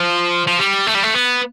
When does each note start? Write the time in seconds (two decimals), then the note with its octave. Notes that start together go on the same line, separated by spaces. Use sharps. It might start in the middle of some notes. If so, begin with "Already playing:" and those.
Already playing: F3
0.47 F3
0.59 G3
0.87 A3
0.95 G3
1.03 A3
1.15 B3